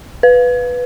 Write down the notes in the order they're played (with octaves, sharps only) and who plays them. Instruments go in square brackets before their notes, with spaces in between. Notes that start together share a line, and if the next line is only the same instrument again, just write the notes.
[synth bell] B4